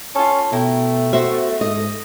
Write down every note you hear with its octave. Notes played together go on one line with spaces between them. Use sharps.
C#4 F4 A4
B2 A3 E4 G5 A#5
F#4 C5 E5
G#2 D#5